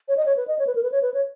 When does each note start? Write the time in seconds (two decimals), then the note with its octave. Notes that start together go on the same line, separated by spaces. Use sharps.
0.08 C#5
0.17 D#5
0.26 C#5
0.37 B4
0.48 D#5
0.59 C#5
0.67 B4
0.75 A#4
0.83 B4
0.92 C#5
1.02 B4
1.14 C#5